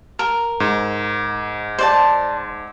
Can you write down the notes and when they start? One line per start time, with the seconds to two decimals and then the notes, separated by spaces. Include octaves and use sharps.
0.19 A#4
0.60 G#2
1.79 C5 D5 A5